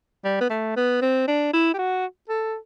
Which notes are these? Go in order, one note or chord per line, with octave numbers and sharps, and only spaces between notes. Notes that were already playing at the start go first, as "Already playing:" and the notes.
G3
B3
A3
B3
C4
D4
E4
G4
F#4
A4